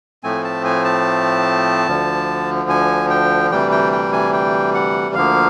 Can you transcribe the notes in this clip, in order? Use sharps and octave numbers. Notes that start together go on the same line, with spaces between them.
A2 F3 A3 C4 G#5
A5
G#5
A5
D2 D3 F3
G#5
G5
D2 C3 E3 G3 G5
G5
G5
G#5
G5
F#5
D2 D3 F3 A#3 F5